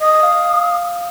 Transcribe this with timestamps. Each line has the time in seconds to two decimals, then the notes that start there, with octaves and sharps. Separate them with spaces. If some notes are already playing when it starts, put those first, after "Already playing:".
0.01 D#5 D#6
0.23 F5